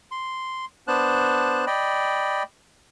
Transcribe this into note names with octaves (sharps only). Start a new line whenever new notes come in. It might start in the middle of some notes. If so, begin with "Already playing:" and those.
C6
B3 D4 C5 A5 F#6
D5 D#5 G5 B5